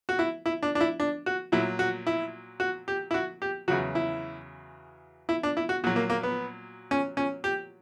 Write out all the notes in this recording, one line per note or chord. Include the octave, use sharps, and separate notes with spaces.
F#4
E4
E4
D4
D4
E4
D4
F#4
A#2 F#3 E4
F#4
E4
F#4
G4
E4
F#4
G4
E2 C#3 F#3 F#4
E4
E4
D4
E4
F#4
A#2 F#3 F#4
A#3
A#3
B3
C#4
C#4
G4